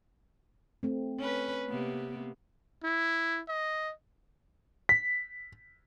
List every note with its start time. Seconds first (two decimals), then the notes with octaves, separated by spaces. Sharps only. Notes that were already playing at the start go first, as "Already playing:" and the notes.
0.83 A3 C4
1.18 C#4 B4
1.69 C3 A#3 B3
2.84 E4
3.48 D#5
4.89 B6